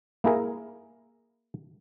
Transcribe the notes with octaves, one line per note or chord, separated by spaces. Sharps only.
A#3 E4 G#4 A#4